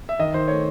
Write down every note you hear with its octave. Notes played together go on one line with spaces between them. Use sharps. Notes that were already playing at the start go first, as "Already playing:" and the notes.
E5
D#3 D#5
D#3 C5
A3 C#5